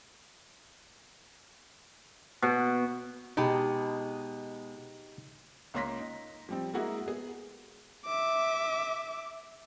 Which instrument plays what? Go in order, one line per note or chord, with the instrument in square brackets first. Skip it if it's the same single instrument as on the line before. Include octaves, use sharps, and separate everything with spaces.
[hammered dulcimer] B2
[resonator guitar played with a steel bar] B2 G#3 A5 [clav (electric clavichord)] D#4 G4
[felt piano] C#2 A#3 C#4 C6 A#6 B6
D#4
F3 G3 C4
G#3 A#3 E4 F#4 G#4 A#4
B3 G#4
[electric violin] E5 D6